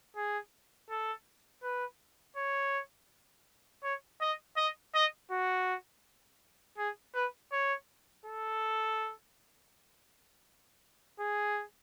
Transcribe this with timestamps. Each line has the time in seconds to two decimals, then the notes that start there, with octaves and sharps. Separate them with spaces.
0.16 G#4
0.90 A4
1.63 B4
2.37 C#5
3.83 C#5
4.21 D#5
4.57 D#5
4.95 D#5
5.31 F#4
6.78 G#4
7.15 B4
7.52 C#5
8.26 A4
11.20 G#4